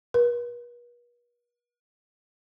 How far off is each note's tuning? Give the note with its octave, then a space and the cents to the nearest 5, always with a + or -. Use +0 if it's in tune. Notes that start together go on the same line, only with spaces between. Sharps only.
B4 -45